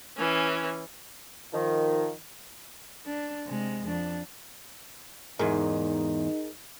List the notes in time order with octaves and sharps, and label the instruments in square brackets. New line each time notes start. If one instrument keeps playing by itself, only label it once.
[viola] E3 C#4
[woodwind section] D#3 F3
[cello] D4
C3 G#3
F2 D4
[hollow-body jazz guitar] E2 G#2 [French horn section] D#4 [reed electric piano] G#4 A#4